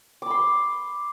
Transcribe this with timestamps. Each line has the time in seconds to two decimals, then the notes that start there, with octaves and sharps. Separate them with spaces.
0.22 D6
0.26 B5
0.31 C6